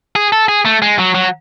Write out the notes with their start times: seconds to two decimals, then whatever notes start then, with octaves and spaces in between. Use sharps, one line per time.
0.16 G#4
0.32 A4
0.49 G#4
0.65 A3
0.82 G#3
0.99 F#3
1.15 F#3